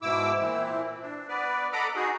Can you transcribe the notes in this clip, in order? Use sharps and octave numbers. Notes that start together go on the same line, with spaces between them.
G#2 B2 E4 D6 E6
A#2 E3 C4 E4
D4
B3 B4 D5
A4 D#5 F#5 A#5 B5 D6
D#4 F#4 G#4